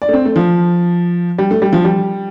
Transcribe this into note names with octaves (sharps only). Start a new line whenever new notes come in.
D5
A3
C4
A3
F3
G3
A3
G3
F3
G3